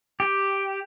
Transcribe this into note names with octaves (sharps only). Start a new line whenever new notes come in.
G4